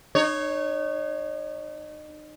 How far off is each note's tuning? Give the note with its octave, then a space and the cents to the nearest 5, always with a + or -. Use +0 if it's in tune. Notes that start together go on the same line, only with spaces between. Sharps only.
D#4 -35 C#5 +0